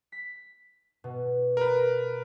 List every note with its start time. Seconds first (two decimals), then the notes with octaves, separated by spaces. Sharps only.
0.12 B6
1.04 B2
1.57 A#4 B4